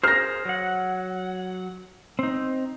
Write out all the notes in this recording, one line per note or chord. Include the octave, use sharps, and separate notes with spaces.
G#4 A#4 C5 F6 A#6
F#3 F#5
C4 D#4